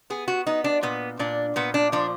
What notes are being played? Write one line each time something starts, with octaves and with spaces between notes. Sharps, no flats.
B3 G#4
F#4
B3 D#4
D4
A#2 B3
A#2 D4
A#2 B3
D4
F3 D4